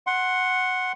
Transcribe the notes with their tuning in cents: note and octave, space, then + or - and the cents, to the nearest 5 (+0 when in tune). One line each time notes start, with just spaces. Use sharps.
F#5 +0 C6 +20